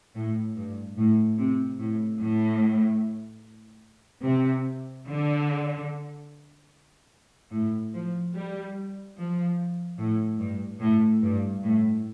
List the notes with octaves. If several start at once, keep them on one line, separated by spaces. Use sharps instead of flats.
A2
G2
A2
C3
A2
A2
C3
D3
A2
F3
G3
F3
A2
G2
A2
G2
A2